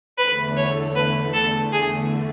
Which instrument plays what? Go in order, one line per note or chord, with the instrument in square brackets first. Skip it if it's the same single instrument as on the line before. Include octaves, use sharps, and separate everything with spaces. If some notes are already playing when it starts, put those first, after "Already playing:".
[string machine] E2 D3 A3 [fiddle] B4
[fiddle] C#5
B4
A4
G#4